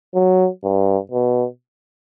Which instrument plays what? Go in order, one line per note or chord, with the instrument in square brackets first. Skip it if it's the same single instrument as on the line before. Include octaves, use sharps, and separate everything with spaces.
[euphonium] F#3
G2
B2